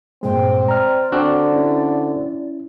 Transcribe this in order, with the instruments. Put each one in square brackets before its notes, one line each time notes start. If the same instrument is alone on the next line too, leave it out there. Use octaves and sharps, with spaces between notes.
[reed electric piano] G2 A#2 G#3 [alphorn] C4 [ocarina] G5
[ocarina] D5 [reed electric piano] A#5 F6
[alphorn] D3 [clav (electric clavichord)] C4 D4 F#4
[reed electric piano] C#4 E4